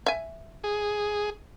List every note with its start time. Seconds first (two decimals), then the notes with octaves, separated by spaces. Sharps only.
0.06 E5 G#5
0.64 G#4